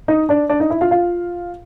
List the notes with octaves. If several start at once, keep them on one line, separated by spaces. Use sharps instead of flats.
D#4 D#5
D4 D5
D4 D5
D#4 D#5
E4 E5
F4 F5
F4 F5